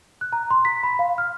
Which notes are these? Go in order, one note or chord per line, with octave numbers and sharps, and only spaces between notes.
F#6
A#5
C6
B6
B5
F5
F6